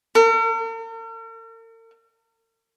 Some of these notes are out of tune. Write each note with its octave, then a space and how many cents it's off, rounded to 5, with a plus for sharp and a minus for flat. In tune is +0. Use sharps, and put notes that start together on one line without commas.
A#4 -45